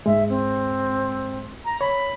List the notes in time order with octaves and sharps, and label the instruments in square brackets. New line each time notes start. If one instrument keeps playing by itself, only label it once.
[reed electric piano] G#2 G#3 [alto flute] E5
[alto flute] C4
A#5
[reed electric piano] C#5 [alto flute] B5